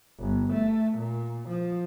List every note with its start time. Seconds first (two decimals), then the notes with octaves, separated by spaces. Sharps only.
0.19 G1
0.52 A3
0.96 A#2
1.48 F3